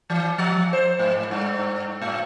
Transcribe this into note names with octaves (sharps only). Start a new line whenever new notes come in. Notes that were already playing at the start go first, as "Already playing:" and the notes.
E3
F3
C5
G#2
G2
A2